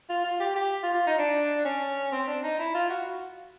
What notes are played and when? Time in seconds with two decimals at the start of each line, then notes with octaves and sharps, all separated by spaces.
0.09 F4
0.24 F4
0.40 G4
0.55 G4
0.83 F4
0.94 F4
1.07 D#4
1.18 D4
1.65 C#4
2.12 C4
2.28 D4
2.43 D#4
2.59 E4
2.74 F4
2.90 F#4